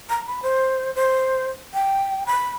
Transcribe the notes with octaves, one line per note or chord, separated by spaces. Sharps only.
A#5
B5
C5
C5
G5
B5